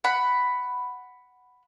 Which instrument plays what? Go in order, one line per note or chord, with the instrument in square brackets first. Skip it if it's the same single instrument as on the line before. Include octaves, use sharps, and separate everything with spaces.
[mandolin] F#5 B5